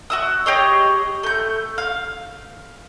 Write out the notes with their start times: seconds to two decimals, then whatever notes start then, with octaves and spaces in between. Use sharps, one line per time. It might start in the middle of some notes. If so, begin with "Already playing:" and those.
0.10 F#4 E5 D#6
0.46 G4 G#4 C#5 D#5
1.23 A3 G6
1.78 F5